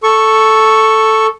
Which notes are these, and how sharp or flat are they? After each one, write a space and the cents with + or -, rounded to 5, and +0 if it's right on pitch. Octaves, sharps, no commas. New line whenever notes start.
A4 +0 C#6 +0